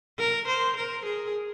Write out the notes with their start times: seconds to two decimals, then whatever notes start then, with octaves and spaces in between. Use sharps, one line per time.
0.18 A#4
0.47 C5
0.76 A#4
1.05 G#4